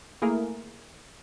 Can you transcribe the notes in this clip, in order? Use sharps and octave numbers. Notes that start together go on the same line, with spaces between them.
A3 A#3 E4 G#4 A#4